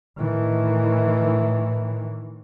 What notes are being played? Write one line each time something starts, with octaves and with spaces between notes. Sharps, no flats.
A2 D#3 E3